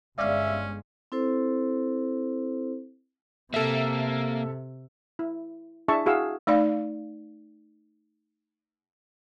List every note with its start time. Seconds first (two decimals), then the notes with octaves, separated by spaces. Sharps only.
0.18 G1 G#3 C#4 D5 E5 F5
1.12 C4 E4 A4 C5
3.54 C3 A#3 A4 E5
5.19 E4
5.88 D4 E4 G#4 E5 A5 C#6
6.06 E4 F#4 G#4 F5 E6
6.47 A3 D#4 D5 F5